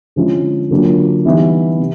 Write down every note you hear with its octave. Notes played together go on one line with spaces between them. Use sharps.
D3 F3 G#3 C#4 E4
D3 F#3 A#3 D4 F4
E3 G3 B3 D#4 G4
C3